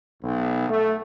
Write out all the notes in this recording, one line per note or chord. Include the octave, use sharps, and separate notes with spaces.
B1
A3